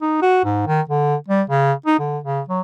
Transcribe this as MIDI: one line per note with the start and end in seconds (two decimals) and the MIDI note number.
0.02 0.19 63
0.22 0.40 66
0.45 0.66 44
0.67 0.81 51
0.89 1.15 50
1.28 1.42 55
1.50 1.73 49
1.86 1.98 63
1.99 2.18 50
2.24 2.41 49
2.48 2.61 54